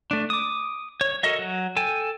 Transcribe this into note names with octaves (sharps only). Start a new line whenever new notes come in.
A3 D4
D6 D#6
C#5
F#4 A4 A#4 D#5 E5
F#3
A4 G5 G#5